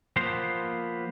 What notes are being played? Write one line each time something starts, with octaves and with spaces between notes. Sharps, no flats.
F3 A#3 B3 C5 C6